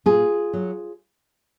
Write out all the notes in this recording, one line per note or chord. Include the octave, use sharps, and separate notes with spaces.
A#2 F4 G#4
F#3